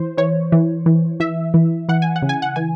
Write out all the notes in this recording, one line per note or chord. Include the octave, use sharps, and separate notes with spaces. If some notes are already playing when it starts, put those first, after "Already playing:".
Already playing: E3 C5
E3 C#5
E3
E3
E3 E5
E3
E3 F#5
G#5
F#5
C#3
G#5
F#5
E3 G#5